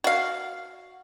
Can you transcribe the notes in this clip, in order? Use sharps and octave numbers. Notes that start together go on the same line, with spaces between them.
F#4 F5